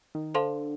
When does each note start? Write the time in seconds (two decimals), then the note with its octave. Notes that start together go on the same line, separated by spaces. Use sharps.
0.15 D#3
0.34 D3 A4 C5 F5 A5 C6